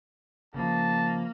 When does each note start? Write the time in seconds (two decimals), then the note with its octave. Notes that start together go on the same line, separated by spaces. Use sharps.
0.54 C#3 F3 A#3 A5